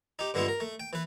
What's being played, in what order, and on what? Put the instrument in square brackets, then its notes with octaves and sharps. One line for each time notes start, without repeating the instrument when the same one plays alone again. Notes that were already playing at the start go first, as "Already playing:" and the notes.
[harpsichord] D#4 G4
G2 D3 G#3 B3 E4 F4
A#4
A3
G5
E3 B4